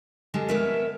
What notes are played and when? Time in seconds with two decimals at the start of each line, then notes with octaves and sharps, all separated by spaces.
0.34 D3 G3 G#3
0.49 B3 A#4 C#5 E5